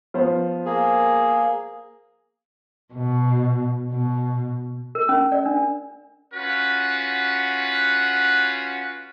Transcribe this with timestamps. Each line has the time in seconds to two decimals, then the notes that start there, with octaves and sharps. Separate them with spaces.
0.14 F3 B3 C5
0.65 A#3 G#4
2.94 B2
3.91 B2
4.95 A#4
5.09 C#4
5.32 D5
5.46 D4
6.34 C#4 F4 F#4 B4 F#5